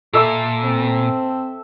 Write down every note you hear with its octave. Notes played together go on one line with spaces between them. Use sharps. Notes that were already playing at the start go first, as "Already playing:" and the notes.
A#2 A4 E5 D6
C4